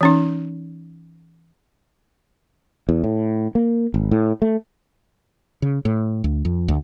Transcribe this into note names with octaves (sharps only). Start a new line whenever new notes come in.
E3 C#4 D#4
E2
A2
A#3
G#1
A2
A3
C#3
A2
D2
F2
D2